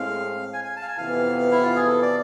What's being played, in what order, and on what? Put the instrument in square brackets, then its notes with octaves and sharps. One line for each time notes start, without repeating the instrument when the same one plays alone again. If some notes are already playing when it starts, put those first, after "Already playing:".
Already playing: [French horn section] A2 G#3 C4 [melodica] F5
[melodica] G#5
G#5
A5
F5
G#5
[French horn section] F2 C3 E3 B3 [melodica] F5
[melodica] E4
F4
G#4
A4
D5